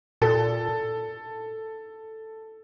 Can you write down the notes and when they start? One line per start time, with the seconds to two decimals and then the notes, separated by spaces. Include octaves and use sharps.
0.22 A#2 A4